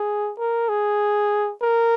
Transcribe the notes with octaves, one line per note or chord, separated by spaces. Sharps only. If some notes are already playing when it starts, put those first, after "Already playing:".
Already playing: G#4
A#4
G#4
A#4